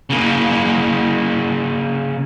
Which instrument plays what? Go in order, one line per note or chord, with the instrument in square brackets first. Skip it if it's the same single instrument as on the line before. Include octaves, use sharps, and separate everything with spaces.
[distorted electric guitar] C#3 A#3